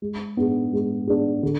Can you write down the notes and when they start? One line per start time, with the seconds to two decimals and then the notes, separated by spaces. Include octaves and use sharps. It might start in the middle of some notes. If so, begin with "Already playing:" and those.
0.02 G#3
0.37 B3 D4 G#4
0.73 G#3
1.07 B3 D4 G#4
1.43 D3